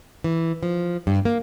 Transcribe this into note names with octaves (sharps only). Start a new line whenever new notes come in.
E3
F3
G2
A#3